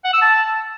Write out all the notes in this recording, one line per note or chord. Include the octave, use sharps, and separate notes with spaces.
F#5
E6
A5